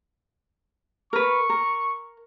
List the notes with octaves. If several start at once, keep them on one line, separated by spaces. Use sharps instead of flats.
A#4 B4 C#6
A#4